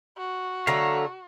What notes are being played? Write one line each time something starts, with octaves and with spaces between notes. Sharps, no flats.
F#4
D3 F#3 A3 F5 A#5